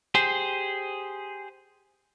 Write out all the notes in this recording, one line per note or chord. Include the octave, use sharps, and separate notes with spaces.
G4 G#4 C5